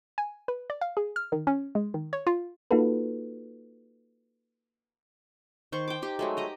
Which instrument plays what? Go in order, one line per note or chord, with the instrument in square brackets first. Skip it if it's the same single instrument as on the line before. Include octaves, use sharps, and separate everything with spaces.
[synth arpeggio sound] G#5
B4
D5
F5
G#4
F6
D#3
C#4
G#3
D#3
C#5
F4
A#3 D#4 F4 F#4 A4 B4
[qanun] D#3 C5 C#6
G5 D6
D#4 G4
F#3 G#3 A3
G4 D#5 A#5